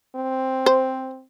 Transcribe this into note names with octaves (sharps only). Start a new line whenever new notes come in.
C4
C5